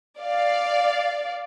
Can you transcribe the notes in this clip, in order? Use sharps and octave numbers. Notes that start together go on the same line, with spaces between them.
D5 F5